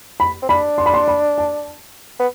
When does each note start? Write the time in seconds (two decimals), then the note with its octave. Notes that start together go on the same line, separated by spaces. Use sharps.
0.20 B5
0.43 C4
0.49 D4 B5
0.78 C6
0.86 B5
0.94 C6
1.08 B5
1.38 A5
2.20 B3